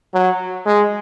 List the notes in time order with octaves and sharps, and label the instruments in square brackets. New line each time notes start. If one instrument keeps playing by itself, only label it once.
[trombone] F#3
G#3